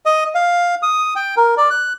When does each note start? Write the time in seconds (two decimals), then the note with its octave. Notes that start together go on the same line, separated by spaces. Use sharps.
0.06 D#5
0.35 F5
0.83 D#6
1.16 G5
1.37 A#4
1.57 D5
1.70 F#6